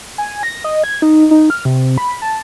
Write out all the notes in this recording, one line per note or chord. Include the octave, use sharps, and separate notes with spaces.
G#5
A#6
D#5
G#6
D#4
D#4
F6
C3
B5
A5